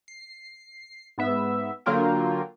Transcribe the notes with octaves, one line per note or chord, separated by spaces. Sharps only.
C7
G#2 B3 E5
D3 F#3 A#3 F4 A#4 G5